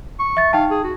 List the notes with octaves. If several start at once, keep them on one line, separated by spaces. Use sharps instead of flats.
C#6
E5 A6
D#4 F5 G5 A5
G#4
F#4